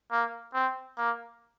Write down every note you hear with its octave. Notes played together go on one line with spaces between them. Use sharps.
A#3
C4
A#3